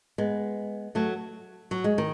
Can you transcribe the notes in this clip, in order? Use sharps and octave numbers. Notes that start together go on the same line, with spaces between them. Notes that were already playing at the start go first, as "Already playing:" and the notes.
G#3 B3
F#3 A3
F#3
G#3
D#3